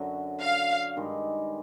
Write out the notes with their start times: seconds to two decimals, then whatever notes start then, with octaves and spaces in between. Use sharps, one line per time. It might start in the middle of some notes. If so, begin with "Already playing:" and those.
Already playing: F#2 D3 F#3
0.41 F5
0.96 G2 D#3 G#3